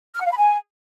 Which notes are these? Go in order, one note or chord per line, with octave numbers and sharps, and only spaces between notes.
F6
F#5
F5
B5
G#5